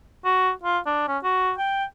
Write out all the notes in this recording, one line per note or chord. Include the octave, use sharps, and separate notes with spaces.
F#4
F4
D4
C#4
F#4
G5